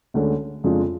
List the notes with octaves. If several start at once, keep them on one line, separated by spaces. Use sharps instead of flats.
D2 D3 G#3 C#4
F2 C#3 G#3 D4 F4